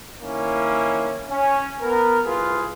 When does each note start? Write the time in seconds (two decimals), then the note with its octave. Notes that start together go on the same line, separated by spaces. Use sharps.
0.21 D#3 A#3 C#4 E4
1.29 C#4
1.81 B3 A#4
2.24 C2 F4 G#4 B4